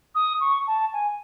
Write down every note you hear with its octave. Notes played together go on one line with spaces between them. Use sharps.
D#6
C#6
A5
G#5